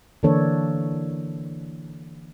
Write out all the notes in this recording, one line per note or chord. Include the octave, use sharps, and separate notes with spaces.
D3 E3 A#3 D4 A4 C#5